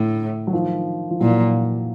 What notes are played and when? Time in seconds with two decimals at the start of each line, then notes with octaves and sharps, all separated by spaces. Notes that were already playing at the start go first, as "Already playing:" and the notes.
Already playing: A2 D3
0.47 F#3
0.53 D#3 F3
1.11 F3
1.20 A#2 E3 F#3